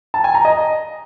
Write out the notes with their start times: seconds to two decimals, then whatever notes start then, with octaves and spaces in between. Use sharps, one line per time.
0.14 A5
0.24 G#5
0.34 A#5
0.45 D#5